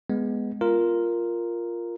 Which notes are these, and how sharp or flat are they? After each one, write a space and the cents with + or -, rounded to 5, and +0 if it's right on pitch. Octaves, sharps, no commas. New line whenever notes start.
G#3 +0 B3 +0
F4 -5 A#4 +0